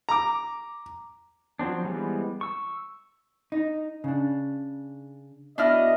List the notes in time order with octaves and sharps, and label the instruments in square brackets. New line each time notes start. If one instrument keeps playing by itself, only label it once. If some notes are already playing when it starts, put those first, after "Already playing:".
[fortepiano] A#5 D6
[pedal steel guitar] F3 F#3 C4 D4
E3 G3 G#3 B3 C4
C#6 E6
[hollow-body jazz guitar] D#4
C#3 D4
[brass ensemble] B2 D#5 [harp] D4 E4 F6